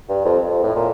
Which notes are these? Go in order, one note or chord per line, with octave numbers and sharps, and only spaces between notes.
G2
F2
F2
A2
A#2